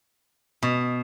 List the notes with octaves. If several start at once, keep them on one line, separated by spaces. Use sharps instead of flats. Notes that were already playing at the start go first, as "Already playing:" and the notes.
B2